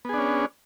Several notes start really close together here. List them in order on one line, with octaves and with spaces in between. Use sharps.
B3 G#4 D4 C#4